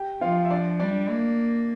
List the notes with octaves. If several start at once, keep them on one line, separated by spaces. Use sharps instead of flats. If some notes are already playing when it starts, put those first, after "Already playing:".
Already playing: G4 G5
F3 F4 F5
E5
D4 D5
G3 D4 D5
A#3